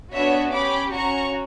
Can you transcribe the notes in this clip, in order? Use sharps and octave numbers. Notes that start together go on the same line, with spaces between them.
B3 D4 F#4 C#5 E5
C#4 G4 B5 D6
C#4 F#4 A#5 C#6